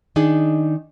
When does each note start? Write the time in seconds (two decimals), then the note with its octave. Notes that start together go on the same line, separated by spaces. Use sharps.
0.16 D#3 D4 D#4 G#4